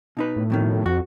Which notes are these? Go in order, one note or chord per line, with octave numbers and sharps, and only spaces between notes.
B2 D#4 B4
A2
F2 B2 D#3
F2 F#4